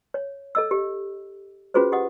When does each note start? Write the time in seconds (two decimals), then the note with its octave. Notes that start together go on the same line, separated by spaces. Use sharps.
0.14 C#5
0.55 A4 D#5 E6
0.71 G4
1.74 C#4 F4 F#4 G#4 B4 C5
1.92 G4 D#5 F#5 D#6